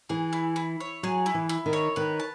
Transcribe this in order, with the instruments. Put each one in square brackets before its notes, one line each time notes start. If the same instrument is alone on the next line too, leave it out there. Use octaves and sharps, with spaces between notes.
[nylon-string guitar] E3 [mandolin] G#4
[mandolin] E4
E4
C#5
[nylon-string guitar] F#3 [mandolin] G#4
[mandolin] E4
[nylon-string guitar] E3
[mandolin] E4
[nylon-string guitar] D#3
[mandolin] C#5
[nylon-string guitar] D#3 [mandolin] B4
[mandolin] A5